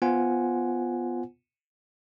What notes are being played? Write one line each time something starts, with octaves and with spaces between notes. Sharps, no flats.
B3 F4 C5 F#5 G#5